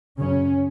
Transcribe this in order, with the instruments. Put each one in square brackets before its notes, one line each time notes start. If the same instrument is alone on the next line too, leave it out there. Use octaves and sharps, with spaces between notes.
[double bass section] F#2 C#3 C#4